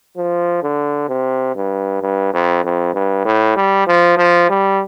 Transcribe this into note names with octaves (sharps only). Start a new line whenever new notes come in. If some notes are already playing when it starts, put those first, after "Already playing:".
F3
D3
C3
G2
G2
F2
F2
G2
A2
G3
F3
F3
G3